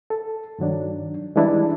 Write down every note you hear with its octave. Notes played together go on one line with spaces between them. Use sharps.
A4
G2 D#3 F#3 D4
E3 G3 G#3 D4 E4